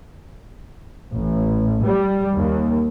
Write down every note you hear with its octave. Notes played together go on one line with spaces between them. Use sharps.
A1
G3
D#2